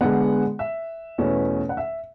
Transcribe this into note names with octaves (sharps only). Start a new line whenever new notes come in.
D3 G#3 B3 F#5
E5
E2 B2 A3 C#4
F#5
E5